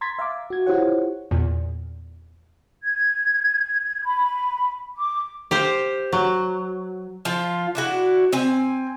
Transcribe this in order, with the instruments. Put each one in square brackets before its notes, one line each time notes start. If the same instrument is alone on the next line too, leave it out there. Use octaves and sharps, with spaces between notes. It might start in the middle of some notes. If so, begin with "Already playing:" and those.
[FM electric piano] A#5 C6 G#6 A6 B6
E5 F5 A#5 D6
F#4 G#6
E4 F4 G4 C5 C#5 F#5
[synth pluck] E2 A#2
[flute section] G#6
B5
D6
[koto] G4 C5 F5
F#3
[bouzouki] F3 F4
D4 E4 F#4
C4 G#5